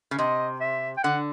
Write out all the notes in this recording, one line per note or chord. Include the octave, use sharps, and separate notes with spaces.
C#3
C3 D#5
E5
G5
D3 F#5